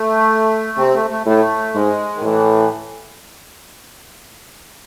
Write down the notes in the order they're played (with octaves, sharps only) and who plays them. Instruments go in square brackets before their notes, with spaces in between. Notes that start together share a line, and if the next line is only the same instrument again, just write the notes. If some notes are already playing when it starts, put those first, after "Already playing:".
Already playing: [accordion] A3
[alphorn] C3 [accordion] C4
[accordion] A3
A3
[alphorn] A2 [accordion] A3
[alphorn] G#2 [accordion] G#3
[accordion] D#3
[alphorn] A2 [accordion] E3